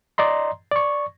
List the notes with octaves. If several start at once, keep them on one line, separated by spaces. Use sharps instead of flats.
D5 D#5 A#5 C6
D5 C#6